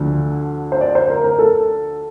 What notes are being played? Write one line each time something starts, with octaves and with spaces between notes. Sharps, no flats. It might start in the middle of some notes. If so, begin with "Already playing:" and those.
Already playing: D2 D3 F3
C5
D5
C5
A#4
A#4
A4